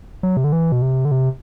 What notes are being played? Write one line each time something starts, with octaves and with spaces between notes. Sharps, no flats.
F#3
C3
D3
E3
B2
C3
D3
C3